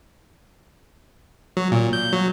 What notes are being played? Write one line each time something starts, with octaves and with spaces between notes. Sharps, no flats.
F#3
A#2
G6
F#3